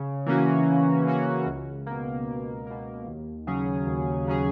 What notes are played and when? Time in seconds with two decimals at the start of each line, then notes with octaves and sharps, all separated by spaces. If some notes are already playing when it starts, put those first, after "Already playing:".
Already playing: C#3
0.26 E3 A#3 C#4 F#4
0.66 C#3
1.06 E3 A#3 C#4 F#4
1.46 C#2
1.87 B2 A#3
2.27 C#2
2.67 B2 A#3
3.07 D#2
3.47 C#3 F#3 C#4 G#4
3.87 D#2
4.27 C#3 F#3 C#4 G#4